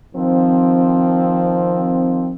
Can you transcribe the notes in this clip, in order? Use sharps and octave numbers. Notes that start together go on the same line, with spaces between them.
D#3 F3 C4